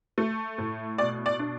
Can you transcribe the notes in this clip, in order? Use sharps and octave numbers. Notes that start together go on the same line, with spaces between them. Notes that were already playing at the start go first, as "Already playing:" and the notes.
A3
A2
B2 D5
D5
D4